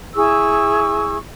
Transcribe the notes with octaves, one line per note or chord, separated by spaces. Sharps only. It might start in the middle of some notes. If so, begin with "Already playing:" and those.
E4 G#4 C#6 E6